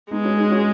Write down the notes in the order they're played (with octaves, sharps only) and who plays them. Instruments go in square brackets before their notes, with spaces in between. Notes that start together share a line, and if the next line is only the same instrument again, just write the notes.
[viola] G#3 [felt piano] B3 D#4
[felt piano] C#4 F#4
D#4 G#4
C#4 F#4